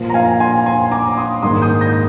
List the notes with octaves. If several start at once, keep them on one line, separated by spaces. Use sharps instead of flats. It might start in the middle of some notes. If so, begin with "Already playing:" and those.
Already playing: A#2 F3 A#3
A#5
F5 G#5
G#5 C6
G#5 C6
A#5 D6
C6 D#6
G#2 D#3 A#3 C6 D#6
D#6 G6
G6 A#6